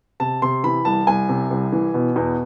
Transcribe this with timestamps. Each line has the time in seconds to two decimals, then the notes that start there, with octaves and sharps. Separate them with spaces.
0.20 C3 A5
0.42 C3 C6
0.64 E3 B5
0.85 C2 A5
1.07 C2 G#5
1.29 C3
1.51 C2
1.72 E3
1.94 B2
2.16 E2